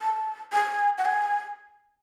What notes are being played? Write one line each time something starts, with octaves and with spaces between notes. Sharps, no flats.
A5
G#5
F#5
G#5